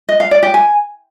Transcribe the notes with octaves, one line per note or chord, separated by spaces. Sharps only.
D#5
F5
D5
G4
G#5